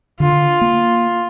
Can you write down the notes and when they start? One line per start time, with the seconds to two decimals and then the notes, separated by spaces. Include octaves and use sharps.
0.20 D3 F4
0.61 A#3